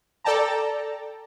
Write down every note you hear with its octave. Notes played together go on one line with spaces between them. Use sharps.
A4 D5 G5 A5 A#5